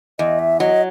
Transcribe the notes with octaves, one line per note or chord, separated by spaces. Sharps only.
E2 D#5
E5
F#3 D#5